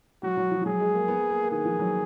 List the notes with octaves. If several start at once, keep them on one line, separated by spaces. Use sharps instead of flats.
F#3 F#4
F#3
F3
F3
F#3 G#4
G#3
A#3
B3
A#3
A#3
A#3
D#3 G#4
F3
F#3